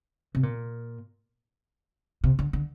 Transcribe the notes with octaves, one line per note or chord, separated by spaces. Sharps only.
C3
A#2
C3
D3
D3